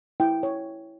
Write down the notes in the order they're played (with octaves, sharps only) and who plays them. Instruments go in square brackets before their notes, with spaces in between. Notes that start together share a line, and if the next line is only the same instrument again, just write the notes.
[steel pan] E4 G5
C#5